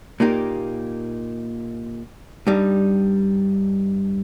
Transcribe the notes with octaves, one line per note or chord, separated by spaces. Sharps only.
A#2 A#3 D#4 G4
G2 G3 D#4